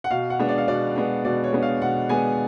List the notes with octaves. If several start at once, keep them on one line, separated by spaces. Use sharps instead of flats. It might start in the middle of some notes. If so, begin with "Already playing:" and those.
F#5
B2 F5
F#5
G#3 B3 D4
D5
F5
B2 D5
G#3 B3 D4
B2 D5
C#5
G#3 B3 D4
F5
B2 F#5
G#3 B3 D4 G#5